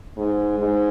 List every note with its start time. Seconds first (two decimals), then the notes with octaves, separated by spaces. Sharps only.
0.17 G#2
0.59 G#2